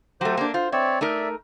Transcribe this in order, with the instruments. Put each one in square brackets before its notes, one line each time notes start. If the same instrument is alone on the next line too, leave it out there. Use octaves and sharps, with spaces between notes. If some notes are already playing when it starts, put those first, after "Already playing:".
[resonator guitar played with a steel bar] F#3 A3 [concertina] G4 C5
[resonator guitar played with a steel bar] A#3 D4
[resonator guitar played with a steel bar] F4 [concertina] C5
[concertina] C4 C#5 D5 [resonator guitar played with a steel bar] E5
[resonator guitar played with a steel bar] A3 D#4 A#4 [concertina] D5 E5